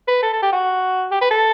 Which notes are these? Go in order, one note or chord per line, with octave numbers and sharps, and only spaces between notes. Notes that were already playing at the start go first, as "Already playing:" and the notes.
B4
A4
A4
G4
F#4
G4
B4
A4